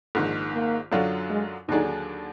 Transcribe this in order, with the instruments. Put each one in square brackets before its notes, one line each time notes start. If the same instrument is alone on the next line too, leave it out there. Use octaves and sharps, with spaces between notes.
[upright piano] A#1 G#2 D#3
[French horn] A#3
[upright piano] F#2 D3 F#3 D4 F4
[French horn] G#3
[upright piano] D#2 D3 F#3 D4 G#4 [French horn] D#4